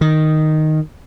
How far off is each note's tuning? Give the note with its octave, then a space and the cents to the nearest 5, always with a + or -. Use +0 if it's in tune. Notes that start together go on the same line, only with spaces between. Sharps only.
D#3 -5